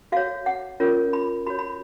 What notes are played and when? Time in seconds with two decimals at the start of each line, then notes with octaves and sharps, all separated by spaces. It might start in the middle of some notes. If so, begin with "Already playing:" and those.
0.12 F#4 C#5 F5
0.46 F#5
0.80 C#4 F4 A#4 C#5
1.13 B5
1.47 F#4 C#5 B5
1.59 B5